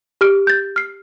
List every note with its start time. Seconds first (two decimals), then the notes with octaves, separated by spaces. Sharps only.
0.21 G4 F6 D7
0.47 G6 A6
0.76 F6 C7